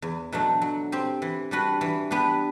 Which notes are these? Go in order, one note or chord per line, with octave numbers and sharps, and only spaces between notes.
E2
B2 F#3 A3 D4
F#3
C4 G4 C5
E3
G3 D4 F#4 B4
E3
B3 D4 G4 B4